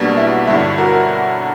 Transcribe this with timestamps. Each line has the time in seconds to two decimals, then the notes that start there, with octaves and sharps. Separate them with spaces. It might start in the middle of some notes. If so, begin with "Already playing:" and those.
Already playing: B1 B2 G3 A#3 D4 F#4
0.17 E4
0.47 G1 G2 D3 E4
0.78 F#4 A#4